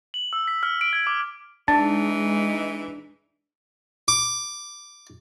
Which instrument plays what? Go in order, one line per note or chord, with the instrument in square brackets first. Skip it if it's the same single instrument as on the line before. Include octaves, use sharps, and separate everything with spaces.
[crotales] F#7
E6
B6
F6
D7
G#6
D6
[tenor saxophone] E3 [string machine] G#3 D#4 [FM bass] D4 [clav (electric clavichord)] A5
[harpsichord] D6